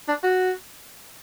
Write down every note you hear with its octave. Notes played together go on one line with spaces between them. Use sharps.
D4
F#4